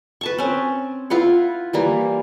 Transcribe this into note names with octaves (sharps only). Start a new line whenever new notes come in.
B4 A5 C#6
C4 C#4
E4 F4 B4 F#5
E3 G3 A#3